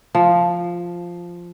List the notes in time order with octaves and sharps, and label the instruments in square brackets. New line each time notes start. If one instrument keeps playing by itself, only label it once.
[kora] F3